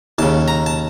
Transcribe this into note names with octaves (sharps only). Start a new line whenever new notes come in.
D#2 C#3 A5
A#5
A5